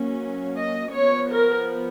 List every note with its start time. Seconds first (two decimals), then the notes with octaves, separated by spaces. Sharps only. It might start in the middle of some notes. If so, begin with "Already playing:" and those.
Already playing: F#3 A#3 C#4
0.58 D#5
0.95 F3 B3 C#5
1.31 A#4